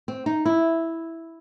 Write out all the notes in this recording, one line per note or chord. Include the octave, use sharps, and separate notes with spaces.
C4
D#4
E4